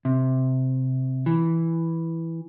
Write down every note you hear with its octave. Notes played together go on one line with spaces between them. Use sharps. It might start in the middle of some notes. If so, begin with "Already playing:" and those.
C3
E3